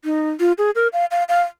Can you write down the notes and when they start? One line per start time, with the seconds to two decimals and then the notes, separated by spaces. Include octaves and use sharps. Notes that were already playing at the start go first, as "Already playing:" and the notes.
0.05 D#4
0.40 F4
0.58 G#4
0.75 A#4
0.93 F5
1.11 F5
1.29 F5